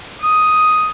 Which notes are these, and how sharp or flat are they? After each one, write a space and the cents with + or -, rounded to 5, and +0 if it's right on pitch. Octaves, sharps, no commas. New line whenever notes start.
D#6 +5